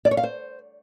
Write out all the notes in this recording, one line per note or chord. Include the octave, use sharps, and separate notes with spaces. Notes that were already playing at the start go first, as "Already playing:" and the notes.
D5
C#5
F5
C5